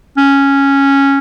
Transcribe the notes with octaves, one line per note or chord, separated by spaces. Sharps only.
C#4